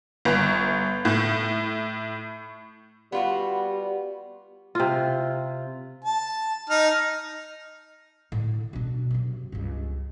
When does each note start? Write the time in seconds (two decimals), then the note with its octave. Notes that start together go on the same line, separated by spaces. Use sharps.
0.25 G1
1.05 A2
3.12 G3 B3 F4 F#4
4.75 C3 F4
6.05 A5
6.70 D#4 F6
8.32 A2 D3
8.73 B2 D4
9.11 F#2 C3
9.52 C#2 G2